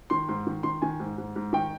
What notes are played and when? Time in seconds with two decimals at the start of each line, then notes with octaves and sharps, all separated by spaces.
0.10 D#3 C6
0.29 G#2 C6
0.47 D#3
0.63 D#3 C6
0.82 D#3 G#5
1.00 G#2
1.18 G#2
1.36 G#2
1.53 D#3 G5